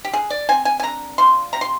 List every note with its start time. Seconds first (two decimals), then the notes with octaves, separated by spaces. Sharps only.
0.05 G4
0.13 D3 G#4
0.30 D5
0.49 C4 G#5
0.65 G#5
0.80 G#5
0.83 D3 A#5
1.18 F3 C6
1.53 C3 A#5
1.61 C6